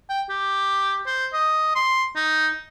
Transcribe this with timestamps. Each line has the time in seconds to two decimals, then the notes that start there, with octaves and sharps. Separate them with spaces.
0.09 G5
0.29 G4
1.06 C5
1.33 D#5
1.75 C6
2.16 D#4